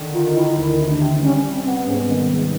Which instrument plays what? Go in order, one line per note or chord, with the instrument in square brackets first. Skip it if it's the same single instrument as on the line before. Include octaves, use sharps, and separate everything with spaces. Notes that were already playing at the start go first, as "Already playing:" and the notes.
Already playing: [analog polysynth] D3 D#3
[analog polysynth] D#3 [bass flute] F4
[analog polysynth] D#3 [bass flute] E4
[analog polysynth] D2 [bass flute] E4
[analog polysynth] C3
[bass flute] D4
[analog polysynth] C3
[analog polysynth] G3 [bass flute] C#4
[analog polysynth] G3
[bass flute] C4
[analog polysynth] B3
[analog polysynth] G#2 [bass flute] C#4
[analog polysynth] D#3
G#2